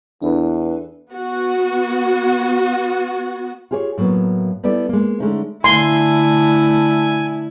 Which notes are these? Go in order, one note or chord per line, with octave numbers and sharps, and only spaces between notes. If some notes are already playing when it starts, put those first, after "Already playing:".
E2 D4 A4 B4
B3 F#4
F4 G4 G#4 B4 C#5
A2 F#3 A#3 B3
G3 B3 E4 A4 D5
G#3 A#3
D3 G#3 A3 C#4 D#4
D3 A3 E4 G#5 C6